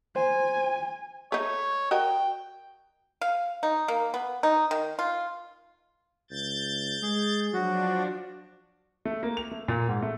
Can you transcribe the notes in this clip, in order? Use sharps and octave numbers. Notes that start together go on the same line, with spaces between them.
C5 G#5
A3 D#4 C#5
F#4 A#4 D#5 G5
F5
D#4
A#3
B3
D#4
D#3
F4
C#2 G6 A6
G#3 G#4
F3 F#3 D4 F#4
A3
A#3
F7
A3
A#2
G#2
A3